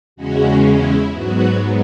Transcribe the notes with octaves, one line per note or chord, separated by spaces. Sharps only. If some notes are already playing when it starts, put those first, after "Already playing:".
E2 C#3 G#3 C#4 F#4
E4
G#2 F#3 B3 F#4